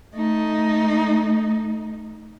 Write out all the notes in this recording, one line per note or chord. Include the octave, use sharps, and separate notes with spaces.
A3 D#4